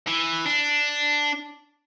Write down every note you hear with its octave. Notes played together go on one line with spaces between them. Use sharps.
E3
D4